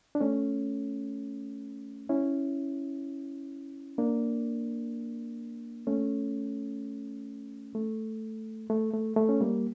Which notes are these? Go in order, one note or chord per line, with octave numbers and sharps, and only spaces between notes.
D4
A3 C#4
C#4 E4
A#3 D4
A3 C#4
A3
A3
A3
A3
C#4
G3 A#3